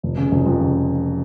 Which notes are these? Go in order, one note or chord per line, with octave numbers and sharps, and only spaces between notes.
F1
C#3
F1
F2
C#3